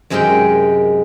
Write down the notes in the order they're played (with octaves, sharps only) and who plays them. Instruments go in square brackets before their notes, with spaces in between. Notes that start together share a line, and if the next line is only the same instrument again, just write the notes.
[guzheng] F#2 C3 G#3 D#4 A#4 G5